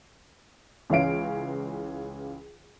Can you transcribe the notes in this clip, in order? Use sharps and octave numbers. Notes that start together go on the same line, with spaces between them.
C#2 E3 C#4 F5 D7